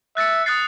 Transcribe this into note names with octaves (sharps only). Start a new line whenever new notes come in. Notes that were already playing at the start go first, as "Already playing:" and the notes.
E5 F#6 A6 C#7
D#6 F#6 A6 C7